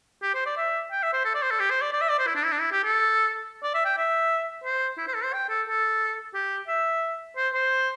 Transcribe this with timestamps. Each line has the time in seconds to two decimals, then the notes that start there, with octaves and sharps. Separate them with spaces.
0.23 G4
0.34 C5
0.46 D5
0.57 E5
0.92 G5
1.03 E5
1.13 C5
1.25 A4
1.34 D5
1.42 C5
1.51 A4
1.60 G4
1.70 C5
1.81 D5
1.92 D5
2.01 E5
2.09 D5
2.19 C5
2.27 E4
2.35 D4
2.44 E4
2.52 D4
2.60 E4
2.72 G4
2.84 A4
3.63 D5
3.75 E5
3.85 G5
3.97 E5
4.64 C5
4.98 E4
5.08 C5
5.15 A4
5.24 C5
5.33 G5
5.49 A4
5.67 A4
6.34 G4
6.68 E5
7.37 C5
7.54 C5